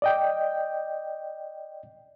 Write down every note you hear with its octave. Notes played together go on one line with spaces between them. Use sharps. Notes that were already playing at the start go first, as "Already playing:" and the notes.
D5 D#5 G5